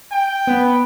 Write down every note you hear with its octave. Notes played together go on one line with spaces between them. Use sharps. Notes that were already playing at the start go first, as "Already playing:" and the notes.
G5
B3